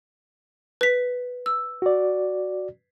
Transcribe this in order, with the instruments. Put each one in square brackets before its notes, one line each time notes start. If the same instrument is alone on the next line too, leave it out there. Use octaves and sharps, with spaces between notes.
[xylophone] B4 B6
E6
[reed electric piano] F#4 D5